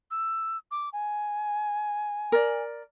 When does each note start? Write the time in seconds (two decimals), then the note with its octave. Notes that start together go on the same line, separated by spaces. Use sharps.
0.11 E6
0.71 D6
0.93 G#5
2.32 A#4 D5